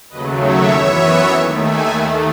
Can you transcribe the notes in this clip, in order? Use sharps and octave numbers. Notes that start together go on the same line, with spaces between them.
D#2 C#3 F#3 A3 B4 D#5
C#5 E5
F#2 E3 B3 C#5 E5
D#2 D#3 A3
E5 G#5
D#2 D#3 A3 F#5 A5